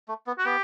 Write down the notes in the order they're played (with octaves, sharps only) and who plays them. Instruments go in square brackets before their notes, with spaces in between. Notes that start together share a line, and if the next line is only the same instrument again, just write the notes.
[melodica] A3
B3
[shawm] F#4
[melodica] B3 [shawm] G4